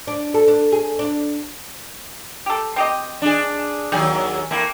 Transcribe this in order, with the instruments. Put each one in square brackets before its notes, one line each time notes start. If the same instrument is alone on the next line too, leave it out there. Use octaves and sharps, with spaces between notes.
[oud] D4
A4
D4
G#4
D4
[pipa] G4 A4
C4 G4 D#5
[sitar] D4 G#4
[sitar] D#2 F#3 G#4 [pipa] G3
[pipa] A3 C4 E4 [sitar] A#3